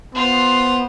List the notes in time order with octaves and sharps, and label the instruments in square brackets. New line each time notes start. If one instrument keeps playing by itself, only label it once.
[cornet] B3 [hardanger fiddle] F4 [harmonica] C5